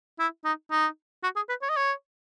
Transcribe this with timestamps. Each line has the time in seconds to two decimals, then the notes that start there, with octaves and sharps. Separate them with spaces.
0.19 E4
0.44 D#4
0.71 D#4
1.23 F#4
1.36 G#4
1.49 B4
1.62 C#5
1.69 D#5
1.77 C#5